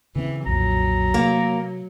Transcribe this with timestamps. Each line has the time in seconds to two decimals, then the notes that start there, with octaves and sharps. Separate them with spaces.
0.16 C#3 E3 C4
0.46 B1 F2 A#2 F#3 A#5
1.14 C3 A#3